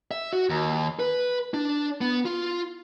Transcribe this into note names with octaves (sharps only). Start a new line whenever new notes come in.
E5
F#4
D#2
B4
D4
B3
F4